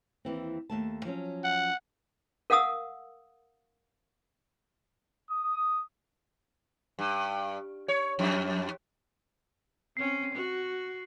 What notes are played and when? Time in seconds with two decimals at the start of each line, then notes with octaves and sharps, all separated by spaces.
0.25 D#2 E3 C4
0.70 D#2 A3 A5
1.05 F3 F#3 C#4
1.44 F#5
2.50 A#4 F5 F#5 D#6 E6
5.30 D#6
6.99 G2
7.88 C#5
8.19 F2
9.97 C4 C#4 C7
10.34 F#4